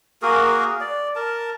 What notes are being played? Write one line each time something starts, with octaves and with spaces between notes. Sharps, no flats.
A#3 F#4 G#4 A#4
D5
A#4 A5